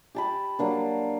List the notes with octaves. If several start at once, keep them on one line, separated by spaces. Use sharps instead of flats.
G4 A5 B5
F#3 A#3 D4